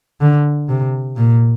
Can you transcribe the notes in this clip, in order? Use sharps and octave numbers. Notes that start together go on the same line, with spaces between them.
D3
C3
A#2